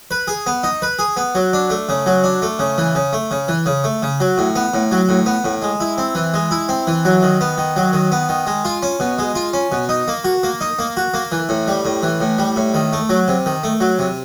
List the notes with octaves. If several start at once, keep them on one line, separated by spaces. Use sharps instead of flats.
B4
G#4
B3
D#4
B4
G#4
B3
F#3
D4
A3
C#3
F#3
D4
A3
C#3
E3
C#3
A3
C#3
E3
C#3
A3
C#3
F#3
A2
B3
A2
F#3
A2
B3
A2
G#3
E4
C4
E3
G#3
E4
C4
E3
F#3
D#3
B3
D#3
F#3
D#3
B3
D#3
G#3
F4
C#4
B2
G#3
F4
C#4
B2
D#4
A#3
F#4
A#3
D#4
A#3
F#4
A#3
E3
A2
G3
A2
E3
A2
G3
A2
D#3
A3
F#3
C3
D#3
A3
F#3
C3